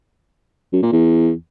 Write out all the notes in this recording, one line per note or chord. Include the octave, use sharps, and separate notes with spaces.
F#2
A#2
E2